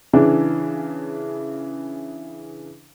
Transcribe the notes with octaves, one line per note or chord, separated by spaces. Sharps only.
C#3 E3 D4